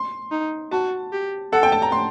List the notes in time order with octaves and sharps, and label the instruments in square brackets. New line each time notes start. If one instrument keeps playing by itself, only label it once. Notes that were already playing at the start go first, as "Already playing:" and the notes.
Already playing: [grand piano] C6
[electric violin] D#4
[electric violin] F#4 [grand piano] A5
[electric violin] G4
[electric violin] A4 [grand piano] F#5
[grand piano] G5
A5
A#5
C6